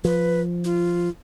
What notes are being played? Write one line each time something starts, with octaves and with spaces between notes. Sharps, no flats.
F3 B4
F4